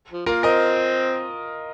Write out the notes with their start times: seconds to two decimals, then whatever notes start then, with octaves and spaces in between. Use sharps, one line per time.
0.11 F3
0.26 A#3 F4 A#4
0.43 C4 A#4 D#5